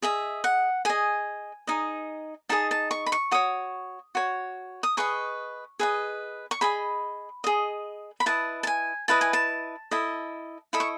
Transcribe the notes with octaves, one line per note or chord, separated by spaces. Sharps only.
G#4 D#5 E5
F#5
G#4 D#5 G#5
D#4 G#4 D#5
D#4 G#4 D#5 A5
A5
C#6
B5
C#6
F#4 C#5 D#6
F#4 C#5
D#6
G#4 B4 D#5 C#6
G#4 B4 D#5
C#6
G#4 D#5 B5
G#4 D#5
B5
E4 B4 D#5 A5
A5
G#5
E4 B4 D#5 A5
G#5
A5
E4 A4 D#5
E4 A4 D#5 B5
C#6